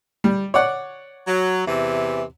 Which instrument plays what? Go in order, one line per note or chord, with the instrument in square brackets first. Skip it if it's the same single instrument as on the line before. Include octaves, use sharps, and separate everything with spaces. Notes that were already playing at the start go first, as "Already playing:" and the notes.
[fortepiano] G3
C#5 D5 F#5
[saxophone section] F#3
E2 C3 E3